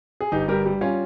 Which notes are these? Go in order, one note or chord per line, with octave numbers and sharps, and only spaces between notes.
G#4
G1 D#4 G4
G3 G4 A#4
G3
G3 C#4 F4